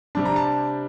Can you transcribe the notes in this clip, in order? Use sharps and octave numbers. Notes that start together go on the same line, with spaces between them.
C3 G3 D4 A5
A#5
A5